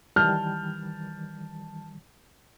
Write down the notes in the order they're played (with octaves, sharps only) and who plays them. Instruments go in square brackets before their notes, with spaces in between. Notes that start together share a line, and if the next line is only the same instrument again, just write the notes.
[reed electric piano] D#3 E3 G3 [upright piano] A5 F6 G6